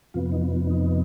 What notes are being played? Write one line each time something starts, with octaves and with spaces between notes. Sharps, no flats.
F2 C3 F3 B3 F4
D#4
D#4